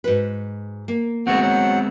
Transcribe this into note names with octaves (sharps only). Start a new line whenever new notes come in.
G#2 F#4 B4
A#3
D2 G#3 B3 C4 F#4 F#5
F#3 F#5